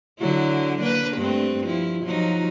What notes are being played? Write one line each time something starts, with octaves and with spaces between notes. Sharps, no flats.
D3 F#3 E4
A#3 D4 B4
G2 A3 C4
F3 E4
F3 F#3 D#4